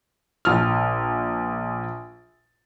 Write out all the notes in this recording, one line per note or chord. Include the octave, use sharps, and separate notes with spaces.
A#1 F6